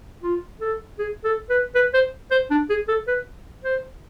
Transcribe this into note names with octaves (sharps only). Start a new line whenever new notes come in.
F4
A4
G#4
A4
B4
B4
C5
C5
D4
G#4
A4
B4
C5